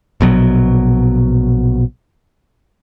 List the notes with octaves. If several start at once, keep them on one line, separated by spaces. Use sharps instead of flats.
A#1 B2 F#3